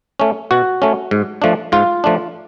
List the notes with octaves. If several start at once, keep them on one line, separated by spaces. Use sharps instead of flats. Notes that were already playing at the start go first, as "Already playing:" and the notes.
A3 C#4
B2 F#4
A3 C#4
G#2
F3 A3 D4
G#2 F4
F3 A3 D4